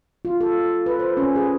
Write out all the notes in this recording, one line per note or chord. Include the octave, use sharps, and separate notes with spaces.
F4
A4
B4
C5
C#4
G#4